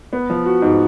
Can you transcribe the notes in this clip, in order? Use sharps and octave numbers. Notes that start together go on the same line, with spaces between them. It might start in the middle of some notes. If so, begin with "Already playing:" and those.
B3
F3
F#4
G#2